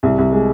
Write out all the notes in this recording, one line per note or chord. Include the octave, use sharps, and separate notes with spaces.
C2
C2
G#3